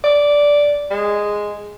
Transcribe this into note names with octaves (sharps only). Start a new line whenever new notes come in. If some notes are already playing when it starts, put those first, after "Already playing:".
D5
G#3